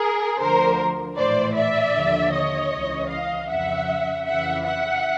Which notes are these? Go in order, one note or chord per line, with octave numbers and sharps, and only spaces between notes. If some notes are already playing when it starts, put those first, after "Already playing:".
Already playing: G#4 A#4
D2 D3 F3 A#4 C5
A#1 A2 E3 C5 D5
D5 E5
D#2 D3 F3
C#5 D#5
C#2 C#3 E3
D#5 F5
F2 C#3 F3 E5 F#5
F2 C#3 E3 E5 F#5
E5 F#5